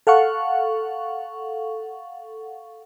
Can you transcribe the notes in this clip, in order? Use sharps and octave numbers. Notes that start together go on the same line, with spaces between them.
A4 F5 F#5 C#6